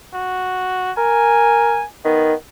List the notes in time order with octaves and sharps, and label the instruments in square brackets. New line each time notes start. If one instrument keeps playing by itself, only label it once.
[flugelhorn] F#4
[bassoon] A#4 [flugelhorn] G#5
[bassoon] D#3 [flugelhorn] B3